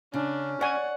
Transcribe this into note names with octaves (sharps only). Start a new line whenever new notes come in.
C#3 C#4 D4
C#5 D5 F#5 G#5